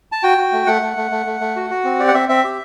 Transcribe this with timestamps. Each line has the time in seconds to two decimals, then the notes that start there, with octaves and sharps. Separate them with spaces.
0.12 A5
0.23 F#4 G5
0.38 F#4
0.52 A3
0.67 A3 F#5
0.82 A3
0.97 A3
1.11 A3
1.26 A3
1.41 A3
1.56 F#4
1.70 F#4
1.84 C4
1.99 G4 D5
2.08 F#5
2.14 C4 E5
2.29 C4 E5
2.44 G4